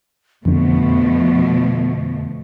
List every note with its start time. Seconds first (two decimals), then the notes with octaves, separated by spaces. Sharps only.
0.45 F2 B2 D3 F3 A3 B3